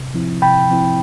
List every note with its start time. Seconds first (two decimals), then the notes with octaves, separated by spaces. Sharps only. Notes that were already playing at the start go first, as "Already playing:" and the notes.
Already playing: C3
0.14 F3 C4 E4
0.42 C3 G5 B5
0.69 F3 C4 E4